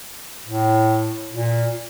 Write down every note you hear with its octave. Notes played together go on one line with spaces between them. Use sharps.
A2
A#2